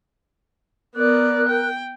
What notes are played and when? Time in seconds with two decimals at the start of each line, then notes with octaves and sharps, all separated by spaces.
0.95 B3 A#4 D5 F#6
1.49 G5